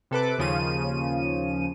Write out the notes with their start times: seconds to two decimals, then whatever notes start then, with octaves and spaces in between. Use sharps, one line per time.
0.11 C3 A4 B4 D6
0.38 D#2 C#3 F3 D#7